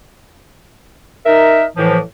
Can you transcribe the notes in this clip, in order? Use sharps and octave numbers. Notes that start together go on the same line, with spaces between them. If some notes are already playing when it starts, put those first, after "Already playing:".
D#4 A#4 E5
A2 E3 F3